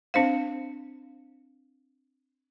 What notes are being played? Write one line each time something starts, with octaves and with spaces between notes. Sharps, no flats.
C4 D4 C5 F5